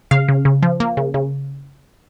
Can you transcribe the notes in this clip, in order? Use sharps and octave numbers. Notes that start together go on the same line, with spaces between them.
C#3 F5
C#3
C#3
F3
A#3
C#3
C#3